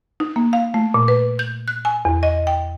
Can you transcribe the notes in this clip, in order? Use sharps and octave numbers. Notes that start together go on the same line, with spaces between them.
D#4
A#3
F5
A3
A#2
B4
G6
F#6
G#5
E2
D#5
G5